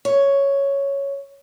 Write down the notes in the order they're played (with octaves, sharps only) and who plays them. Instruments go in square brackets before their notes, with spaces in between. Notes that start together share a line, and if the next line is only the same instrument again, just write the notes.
[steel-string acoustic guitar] C#5